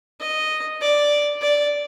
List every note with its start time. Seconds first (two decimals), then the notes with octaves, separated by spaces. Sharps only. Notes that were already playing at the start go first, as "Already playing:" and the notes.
0.20 D#5
0.81 D5
1.42 D5